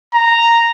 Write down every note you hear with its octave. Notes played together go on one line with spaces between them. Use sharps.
A#5